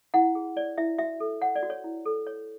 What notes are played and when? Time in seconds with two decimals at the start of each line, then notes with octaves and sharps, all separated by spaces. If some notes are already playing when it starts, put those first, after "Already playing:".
0.14 E4 F#5
0.35 G#4
0.57 C#5 D5
0.78 E4 E5
0.98 F#4 E5
1.20 A4
1.41 C#5 F#5
1.56 D5
1.63 F#4
1.70 C#5
1.84 E4
2.05 A4
2.27 C#5